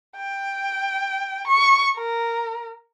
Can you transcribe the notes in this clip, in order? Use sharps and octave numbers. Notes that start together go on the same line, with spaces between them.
G5
C#6
A#4